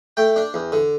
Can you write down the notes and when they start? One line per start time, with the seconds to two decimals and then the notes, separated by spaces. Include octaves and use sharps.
0.17 A3 G5
0.36 D4
0.54 E2
0.72 D3